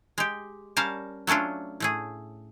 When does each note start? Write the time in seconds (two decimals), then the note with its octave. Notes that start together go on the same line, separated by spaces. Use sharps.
0.18 G#3 G4
0.77 G3 C#4 A#4 F5 A5
1.27 F#3 A3 C#4 D4 F4
1.80 A2 A3 G#4